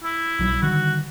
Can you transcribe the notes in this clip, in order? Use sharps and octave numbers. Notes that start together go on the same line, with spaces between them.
E4
B1 F#3 G3
D3 D#3 G3 F#4